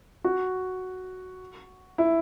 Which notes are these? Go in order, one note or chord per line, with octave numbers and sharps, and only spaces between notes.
F#4
E4